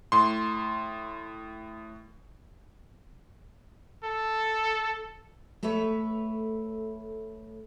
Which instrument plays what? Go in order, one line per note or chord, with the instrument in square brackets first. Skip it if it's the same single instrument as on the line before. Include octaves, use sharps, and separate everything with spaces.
[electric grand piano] A2 C6
[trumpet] A4
[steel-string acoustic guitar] A3 A4 B4 C#5 E5